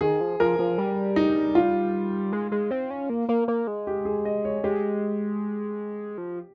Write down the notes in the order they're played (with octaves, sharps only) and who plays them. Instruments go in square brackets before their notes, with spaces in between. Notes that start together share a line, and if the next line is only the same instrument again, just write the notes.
[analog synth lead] D#3 [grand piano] G#4
[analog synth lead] F3
[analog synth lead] F3 [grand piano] A#4
[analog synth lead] F3
G3
[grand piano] D#4
F4
[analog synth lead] G#3
G#3
C4
C#4
A#3
A#3
A#3
G#3
[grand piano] G4
G#4
D#5
C#5
[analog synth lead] G#3 [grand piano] G4
[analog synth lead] F3